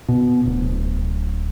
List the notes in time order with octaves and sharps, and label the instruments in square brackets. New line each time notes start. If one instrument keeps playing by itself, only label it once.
[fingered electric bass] B2
D1